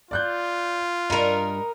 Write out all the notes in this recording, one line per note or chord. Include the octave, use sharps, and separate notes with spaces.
F4 D5 F#6 G6
G2 D4 D#4 A#4 B5